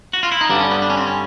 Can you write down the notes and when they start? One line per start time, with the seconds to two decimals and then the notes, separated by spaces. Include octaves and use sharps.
0.13 F#4
0.23 F4
0.32 E4
0.41 D#4
0.50 G2 D3 G3 D4
0.60 C#4
0.71 B3
0.82 D4
0.90 C#4
0.97 C4
1.07 C#4